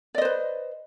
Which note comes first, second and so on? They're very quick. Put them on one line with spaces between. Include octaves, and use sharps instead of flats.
D5 D#5 C5 B4